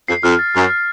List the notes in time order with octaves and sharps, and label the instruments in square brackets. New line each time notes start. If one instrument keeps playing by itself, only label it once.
[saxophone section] F2 [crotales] C7
[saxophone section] F2 [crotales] F6
[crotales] A6
[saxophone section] F#2 [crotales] F6
[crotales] F6